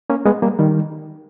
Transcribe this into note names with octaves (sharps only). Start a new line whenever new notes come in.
A#3 C#4
G#3 B3
G3 A#3
D#3 G3